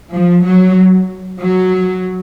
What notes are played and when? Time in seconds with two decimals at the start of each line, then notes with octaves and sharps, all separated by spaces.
0.12 F3
0.44 F#3
1.41 F#3